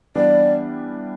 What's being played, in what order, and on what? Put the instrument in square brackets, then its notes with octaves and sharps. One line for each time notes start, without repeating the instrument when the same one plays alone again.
[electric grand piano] E3 G3 B3 D4 [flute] D5